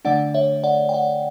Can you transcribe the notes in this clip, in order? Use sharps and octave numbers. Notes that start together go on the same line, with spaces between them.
D3 A3 D4 D5 F#5
C#5 E5
D5 F#5
G5
D5 F#5